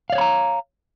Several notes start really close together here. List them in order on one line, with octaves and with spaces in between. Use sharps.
F5 D5 C#5 B5 A#5